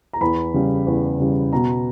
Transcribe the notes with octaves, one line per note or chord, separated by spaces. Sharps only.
A#5
E2 B5
C#3 G3
E2
C#3 G3
B2 A#5